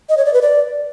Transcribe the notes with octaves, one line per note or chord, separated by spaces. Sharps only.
D#5
C#5
D5
B4
D5